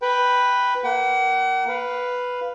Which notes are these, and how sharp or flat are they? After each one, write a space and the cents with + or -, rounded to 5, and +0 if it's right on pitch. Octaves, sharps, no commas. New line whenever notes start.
B4 +0 G5 +0
A#3 +0 F#5 +40
B4 +0 F5 +0